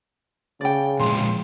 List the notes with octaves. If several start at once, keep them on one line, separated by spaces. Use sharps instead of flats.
C#3 D5 G5
A#2 F3 G#3 C6